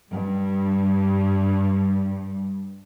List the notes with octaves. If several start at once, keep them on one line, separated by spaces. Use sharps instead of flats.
G2 G3